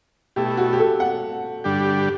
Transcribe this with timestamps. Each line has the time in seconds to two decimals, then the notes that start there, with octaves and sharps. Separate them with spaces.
0.36 B2 A3 E4 G4
0.57 F#4
0.73 G4
0.79 A4
1.00 F#5
1.64 G2 D3 G3 D4 G4